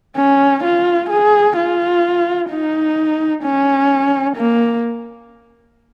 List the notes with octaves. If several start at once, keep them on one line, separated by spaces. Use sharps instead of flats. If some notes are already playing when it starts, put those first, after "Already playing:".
C#4
F4
G#4
F4
D#4
C#4
A#3